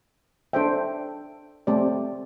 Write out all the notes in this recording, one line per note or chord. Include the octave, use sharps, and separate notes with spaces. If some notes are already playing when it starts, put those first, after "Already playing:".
D4 A4 C5 E5 G5
A3 C4 G4 D5